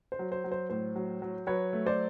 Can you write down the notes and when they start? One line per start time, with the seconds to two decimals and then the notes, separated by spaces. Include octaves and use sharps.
0.12 C5
0.19 F#3
0.32 C5
0.44 F#3
0.52 C5
0.70 A2 C5
0.96 F#3
1.22 F#3
1.47 F#3 B4 C#5
1.73 A3
1.86 C5 D5